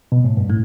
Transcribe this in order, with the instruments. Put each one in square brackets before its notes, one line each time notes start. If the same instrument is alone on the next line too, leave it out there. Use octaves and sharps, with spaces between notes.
[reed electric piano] B2
A2
G2
[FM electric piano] A2